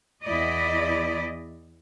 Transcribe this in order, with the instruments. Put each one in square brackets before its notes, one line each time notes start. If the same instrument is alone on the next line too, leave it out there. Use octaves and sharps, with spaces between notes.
[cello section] E2 E4 D5 D#5